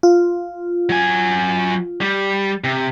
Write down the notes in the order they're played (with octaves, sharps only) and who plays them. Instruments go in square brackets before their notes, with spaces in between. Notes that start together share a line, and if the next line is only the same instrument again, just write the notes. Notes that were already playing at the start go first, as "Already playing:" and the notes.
[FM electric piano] F4
[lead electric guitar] F#3 G#5
G3
C3